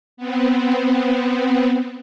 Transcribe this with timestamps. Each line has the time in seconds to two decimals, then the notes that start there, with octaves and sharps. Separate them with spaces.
0.17 B3 C4